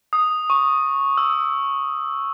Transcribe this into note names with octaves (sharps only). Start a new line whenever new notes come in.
D#6
C#6
E6